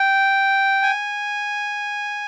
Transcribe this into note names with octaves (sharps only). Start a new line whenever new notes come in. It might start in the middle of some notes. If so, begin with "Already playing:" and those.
Already playing: G5
G#5